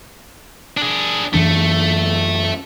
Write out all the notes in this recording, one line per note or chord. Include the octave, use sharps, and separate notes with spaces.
D4 G#4
F#2 E3 A3 D4